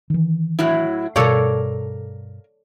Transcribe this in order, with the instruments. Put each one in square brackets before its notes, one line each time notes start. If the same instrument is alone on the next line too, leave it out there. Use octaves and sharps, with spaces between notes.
[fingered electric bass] D#3 E3
[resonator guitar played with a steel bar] A2 F#3 E4
[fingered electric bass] G2 B2 [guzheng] A4 C#5 D5 [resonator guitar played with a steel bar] A#4 F5